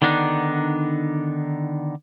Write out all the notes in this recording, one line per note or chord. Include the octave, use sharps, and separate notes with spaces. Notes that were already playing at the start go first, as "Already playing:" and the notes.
D3 D#3 B3 D4 D#4